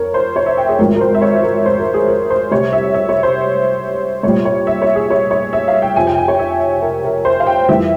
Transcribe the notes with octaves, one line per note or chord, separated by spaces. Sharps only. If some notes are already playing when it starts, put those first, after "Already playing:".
Already playing: F2 A#4 C#5
C5
C#5
E5
G5
G#4
G#1 G#2 F3 A#4
A#4
C5
E5
C#5
A#4
C5
A#4
G#4
A#4
C5
C2 C3 G3 C#5
E5
E5
C#5
C5
C2 A#2 G3 C#5
C#5
E5
C#5
G#4
C#5
C#5
E5
F5
G5
F2 C3 F3 G#5
G5
G#5
C#5
E5
A#4
A#4
C5
F5
G5
F2 E3 G3 E5